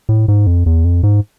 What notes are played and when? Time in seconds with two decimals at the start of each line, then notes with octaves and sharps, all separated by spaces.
0.09 A2
0.28 G#2
0.47 F2
0.66 E2
0.84 F2
1.03 G#2